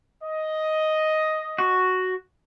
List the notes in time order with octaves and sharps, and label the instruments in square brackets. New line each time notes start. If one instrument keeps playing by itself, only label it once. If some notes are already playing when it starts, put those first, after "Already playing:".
[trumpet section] D#5
[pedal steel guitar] F#4